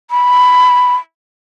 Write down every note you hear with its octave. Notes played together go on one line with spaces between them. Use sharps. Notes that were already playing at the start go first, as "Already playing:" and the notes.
B5